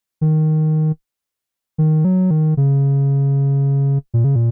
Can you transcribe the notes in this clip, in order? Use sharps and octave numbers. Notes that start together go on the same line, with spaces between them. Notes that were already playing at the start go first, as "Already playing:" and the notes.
D#3
D#3
F#3
D#3
C#3
A#2
C#3
A#2